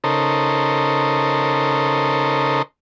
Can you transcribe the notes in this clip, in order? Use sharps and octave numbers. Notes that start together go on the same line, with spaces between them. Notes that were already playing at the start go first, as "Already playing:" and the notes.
C#3 D#4 A4 A#4 C5